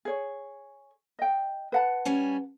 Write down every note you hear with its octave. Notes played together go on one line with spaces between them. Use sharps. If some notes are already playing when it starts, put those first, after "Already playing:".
G#4 C#5
D#5 G5
B4 F#5 A5
G3 C#4 G#5